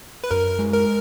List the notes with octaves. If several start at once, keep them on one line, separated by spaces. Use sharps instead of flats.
B4
F#2 A#4
G#3
A#4